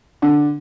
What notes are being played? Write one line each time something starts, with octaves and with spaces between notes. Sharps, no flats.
D3